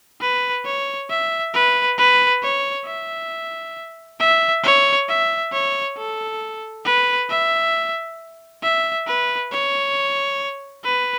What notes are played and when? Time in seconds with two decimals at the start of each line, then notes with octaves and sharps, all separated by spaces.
0.21 B4
0.65 C#5
1.10 E5
1.54 B4
1.98 B4
2.43 C#5
2.86 E5
4.19 E5
4.64 C#5
5.09 E5
5.52 C#5
5.97 A4
6.85 B4
7.29 E5
8.63 E5
9.07 B4
9.52 C#5
10.84 B4